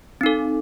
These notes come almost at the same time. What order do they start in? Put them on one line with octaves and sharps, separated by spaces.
C4 D#4 A4